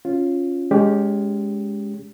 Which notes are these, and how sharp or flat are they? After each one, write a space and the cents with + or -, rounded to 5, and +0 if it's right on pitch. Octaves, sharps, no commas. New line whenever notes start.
C#4 -5 F4 +0
G#3 +0 C#4 +30 G4 +0